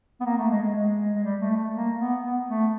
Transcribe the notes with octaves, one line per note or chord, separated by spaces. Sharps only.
B3
A#3
A3
G#3
G#3
G#3
G#3
G3
A3
A3
A#3
B3
B3
A3